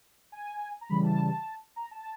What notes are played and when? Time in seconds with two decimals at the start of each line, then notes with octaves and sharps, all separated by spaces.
0.32 G#5
0.81 A#5
0.89 C#3 E3 G3 B5
1.04 A5
1.76 A#5
1.91 A5